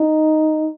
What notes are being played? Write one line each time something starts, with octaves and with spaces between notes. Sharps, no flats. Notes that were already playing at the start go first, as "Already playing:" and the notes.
Already playing: D#4